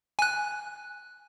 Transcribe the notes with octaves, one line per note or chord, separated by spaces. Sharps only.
G#5 F#6